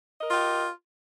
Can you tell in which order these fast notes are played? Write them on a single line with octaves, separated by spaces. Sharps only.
D#5 A#4 F4 G4